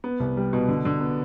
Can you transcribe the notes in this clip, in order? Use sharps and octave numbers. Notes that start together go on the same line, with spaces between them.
B3
C2
G3
B2
D3
D3
B3